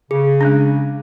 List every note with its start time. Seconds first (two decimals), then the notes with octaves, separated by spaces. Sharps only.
0.11 C#3 G#4
0.41 G#3 C#4 D4